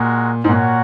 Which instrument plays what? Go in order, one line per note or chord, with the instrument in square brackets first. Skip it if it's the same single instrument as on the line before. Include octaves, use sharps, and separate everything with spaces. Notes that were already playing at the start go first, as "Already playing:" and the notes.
Already playing: [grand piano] A#2 [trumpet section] G#3 F#4 A#4
[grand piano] G#2
[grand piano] A#2 [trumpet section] F#4 A#4 C#5 F#5